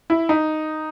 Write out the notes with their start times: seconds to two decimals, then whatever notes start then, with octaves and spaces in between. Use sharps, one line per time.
0.10 E4
0.29 D#4